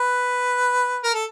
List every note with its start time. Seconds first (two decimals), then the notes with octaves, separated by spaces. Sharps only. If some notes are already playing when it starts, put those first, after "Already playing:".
Already playing: B4
1.04 A#4
1.14 A4